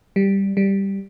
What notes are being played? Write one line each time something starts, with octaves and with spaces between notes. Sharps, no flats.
G3
G3